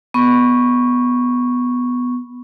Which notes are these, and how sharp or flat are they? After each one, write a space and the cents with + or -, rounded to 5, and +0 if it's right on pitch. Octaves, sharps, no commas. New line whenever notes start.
B3 +0 C#6 -5